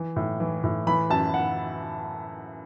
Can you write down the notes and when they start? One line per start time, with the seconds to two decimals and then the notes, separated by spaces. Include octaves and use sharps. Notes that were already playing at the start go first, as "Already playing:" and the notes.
Already playing: E3
0.16 A2
0.40 E3
0.64 A2
0.87 E3 B5
1.10 F#2 A5
1.34 F#5